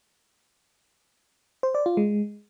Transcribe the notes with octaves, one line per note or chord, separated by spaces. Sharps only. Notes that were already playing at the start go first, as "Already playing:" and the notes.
C5
D5
F4
G#3